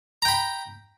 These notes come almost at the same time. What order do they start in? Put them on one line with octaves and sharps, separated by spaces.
A#5 G5 B5